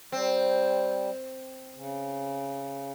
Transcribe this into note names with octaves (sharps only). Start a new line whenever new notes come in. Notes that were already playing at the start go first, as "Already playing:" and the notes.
G3 C4
C#3